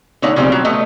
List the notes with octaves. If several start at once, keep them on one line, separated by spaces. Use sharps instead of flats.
D3 A3 D#4 C#5 D5 F#5
C#3 F3 G3 A3 C4
F#3
A3 B3 D#5